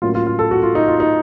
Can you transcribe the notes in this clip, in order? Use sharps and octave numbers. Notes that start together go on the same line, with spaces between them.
A2 F#3 A#3 C#4 F4
F4
F4
A4
F#4
F4
D#4
F4
D#4